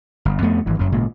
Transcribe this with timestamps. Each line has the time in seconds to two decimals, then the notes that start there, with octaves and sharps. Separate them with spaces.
0.25 G1
0.42 F2 A3 B3
0.66 G#1 G2 E3
0.79 F#1 F#2 F#3
0.92 G#1 A#2 C#3 G#3